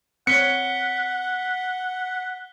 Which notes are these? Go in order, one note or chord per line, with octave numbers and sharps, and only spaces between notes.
C4 C#5 F#5 F#6 B6 C#7 G7